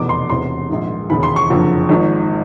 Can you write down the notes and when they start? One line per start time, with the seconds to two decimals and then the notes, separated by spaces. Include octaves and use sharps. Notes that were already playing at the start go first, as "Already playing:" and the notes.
Already playing: F1 E2 B2 D6
0.09 C6
0.29 E1 E2 C3 C6
0.69 A#1 G#2 D#3
1.10 E1 D#2 C#3 E3 B5
1.23 C6
1.36 C#6
1.50 F#1 F2 D3 F3
1.89 G#1 G#2 F3